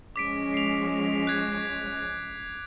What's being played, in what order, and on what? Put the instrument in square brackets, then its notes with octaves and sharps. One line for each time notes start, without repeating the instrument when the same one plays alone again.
[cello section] F3 G#3 C#4 [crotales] D6 B6 D7
[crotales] C7 F7
F#6 G#6